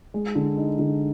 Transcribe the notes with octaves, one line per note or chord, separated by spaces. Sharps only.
G#3
D3
D#4
D3